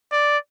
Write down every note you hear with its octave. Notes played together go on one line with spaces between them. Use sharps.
D5